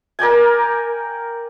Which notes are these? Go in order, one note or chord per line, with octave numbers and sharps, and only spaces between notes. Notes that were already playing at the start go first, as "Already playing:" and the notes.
A#4 D5 G5 G#5